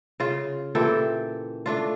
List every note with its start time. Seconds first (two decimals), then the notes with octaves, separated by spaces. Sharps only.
0.20 C#3 F4
0.75 A#2 E3 G4 A4
1.66 A3 D4 F4